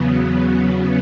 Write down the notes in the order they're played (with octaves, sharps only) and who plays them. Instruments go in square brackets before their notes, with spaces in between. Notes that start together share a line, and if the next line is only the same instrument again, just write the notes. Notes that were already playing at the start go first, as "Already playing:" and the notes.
Already playing: [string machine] E2 C#3 F#3 B3